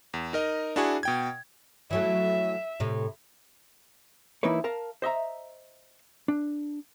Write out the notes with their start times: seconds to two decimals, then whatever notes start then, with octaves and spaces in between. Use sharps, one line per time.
0.14 E2
0.33 D#4 A#4 D#5
0.76 D4 E4 F#4 G#4 G#5 C#6
1.03 B2 G5 G#6
1.91 E3 F#3 A3 E5
2.80 A2 C3
4.43 E3 A#3 D#4 E4 B4 C#5
4.64 A#4 F5 A5
5.02 C5 D#5 E5 A#5
6.28 D4